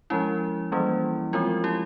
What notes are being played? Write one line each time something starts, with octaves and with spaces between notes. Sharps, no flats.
F3 G#3 C#4 E4
E3 G3 A#3 C#4
F3 G#3 C4 F4
E4 G4